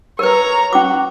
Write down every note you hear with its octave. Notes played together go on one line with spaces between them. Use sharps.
A#4 B4 C#5 A#5
C#4 F#4 D6